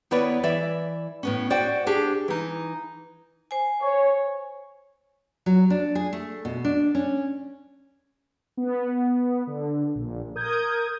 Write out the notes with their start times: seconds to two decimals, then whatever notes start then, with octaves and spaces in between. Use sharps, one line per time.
0.11 D#2 B3 E4 B4 C#5 D5
0.43 E3 D5 E5
1.23 A2 B3 C#4
1.50 F#4 C5 D5 F#5 G5
1.87 D4 G4 G#4
2.28 E3 D#4
3.51 C5 G#5
3.82 C#5
5.46 F#3
5.70 D4
5.95 G#4
6.13 A3
6.45 B2
6.65 D4
6.95 C#4
8.57 B3
9.47 D3
9.95 A#1
10.35 A#4 D#6 G6 G#6